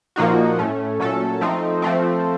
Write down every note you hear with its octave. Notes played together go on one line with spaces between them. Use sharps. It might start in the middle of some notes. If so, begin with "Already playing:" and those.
A#2 F3 A#3 D#4 F#4
A2 A3 C#4
A#2 F#3 A3 C#4 A4
F3 A3 C4 D#4
F3 A3 C4